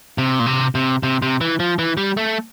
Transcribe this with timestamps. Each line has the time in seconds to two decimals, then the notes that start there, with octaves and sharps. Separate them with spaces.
0.18 C3
0.39 A#2
0.46 C3
0.75 C3
1.03 C3
1.22 C3
1.41 E3
1.60 F3
1.79 E3
1.97 G3
2.17 A3